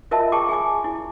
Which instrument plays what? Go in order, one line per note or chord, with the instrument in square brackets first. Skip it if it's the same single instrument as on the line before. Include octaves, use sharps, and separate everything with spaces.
[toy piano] F4 A#4 D#5 E5 A5 B5
G#4 G5 A5 A#5 C#6 D6
G#4 G#5 D6
E4